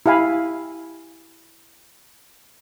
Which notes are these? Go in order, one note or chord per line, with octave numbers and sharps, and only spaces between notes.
E4 G4 F5 G#5 B5